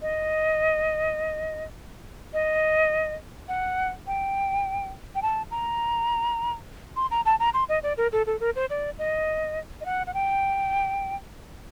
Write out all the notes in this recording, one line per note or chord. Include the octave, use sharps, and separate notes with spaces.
D#5
D#5
F#5
G5
G5
A5
A#5
C6
A#5
A5
A#5
C6
D#5
D5
A#4
A4
A4
A#4
C5
D5
D#5
D#5
F#5
F#5
G5